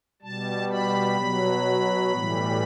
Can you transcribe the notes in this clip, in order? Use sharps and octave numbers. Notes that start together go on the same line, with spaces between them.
B2 G3 A5
B5
B2 F#3
A2 E3 G3